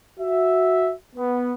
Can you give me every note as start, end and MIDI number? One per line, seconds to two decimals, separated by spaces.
0.20 0.93 66
0.20 0.93 76
1.16 1.54 59